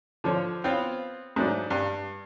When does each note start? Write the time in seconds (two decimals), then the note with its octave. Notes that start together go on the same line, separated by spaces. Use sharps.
0.24 D3 F3 C#5
0.64 B3 C4 F4 C5 C#5 F5
1.36 G#2 F#3 A3 D4
1.70 G2